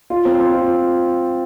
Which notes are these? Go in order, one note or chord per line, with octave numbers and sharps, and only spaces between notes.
F4
C4
C4
F4